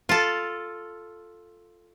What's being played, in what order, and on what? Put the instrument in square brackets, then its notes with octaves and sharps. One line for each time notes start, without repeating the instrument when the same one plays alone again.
[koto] F4 A4